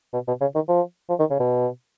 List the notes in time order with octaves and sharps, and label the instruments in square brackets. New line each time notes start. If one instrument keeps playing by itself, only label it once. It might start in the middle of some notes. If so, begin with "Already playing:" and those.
[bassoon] B2
B2
C#3
D#3
F3
F3
D#3
C#3
B2